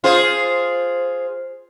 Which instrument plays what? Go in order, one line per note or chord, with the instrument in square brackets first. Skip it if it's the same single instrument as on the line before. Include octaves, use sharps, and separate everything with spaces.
[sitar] F4 G#4 C5